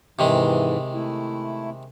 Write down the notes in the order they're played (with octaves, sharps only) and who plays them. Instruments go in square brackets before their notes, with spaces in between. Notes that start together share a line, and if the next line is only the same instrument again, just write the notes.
[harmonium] G#2 E3 [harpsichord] C3 D#3 G#3
[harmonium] A3 E4